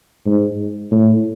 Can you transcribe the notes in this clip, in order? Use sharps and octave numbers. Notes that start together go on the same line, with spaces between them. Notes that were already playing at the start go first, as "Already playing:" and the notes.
G#2
A2